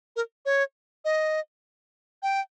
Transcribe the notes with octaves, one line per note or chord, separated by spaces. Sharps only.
A#4
C#5
D#5
G5